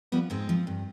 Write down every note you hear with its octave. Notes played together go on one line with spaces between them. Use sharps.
F3 G3 B3
G#2 G#3 C4
F3
G2